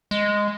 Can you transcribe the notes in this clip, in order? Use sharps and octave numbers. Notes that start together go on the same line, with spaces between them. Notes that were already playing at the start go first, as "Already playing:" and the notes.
G#3